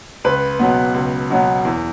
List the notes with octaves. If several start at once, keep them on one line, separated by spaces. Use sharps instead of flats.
C#2 B4
B2 F#3 B3
C#2
B2 F#3 B3
E2